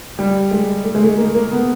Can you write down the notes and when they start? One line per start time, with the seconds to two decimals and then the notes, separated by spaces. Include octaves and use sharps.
0.19 G3
0.51 G#3
0.84 A3
0.95 G#3
1.03 A3
1.17 A#3
1.35 A#3
1.51 B3